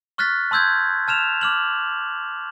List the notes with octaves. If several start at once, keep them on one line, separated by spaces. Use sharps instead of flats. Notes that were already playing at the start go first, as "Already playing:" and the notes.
C#6 F6 F#6 A6 B6
A5 C6 E6 G6 G#6
A5 F6 E7 F7
D6 F6 F#7